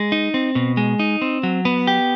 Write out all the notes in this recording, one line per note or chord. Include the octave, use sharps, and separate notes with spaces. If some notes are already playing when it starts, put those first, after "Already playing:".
Already playing: G#3
D#4
C4
B2
G#3
D#4
C4
F#3
B3
G4